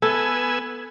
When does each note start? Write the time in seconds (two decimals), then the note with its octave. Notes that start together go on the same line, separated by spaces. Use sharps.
0.02 B3 A4 G#5 E6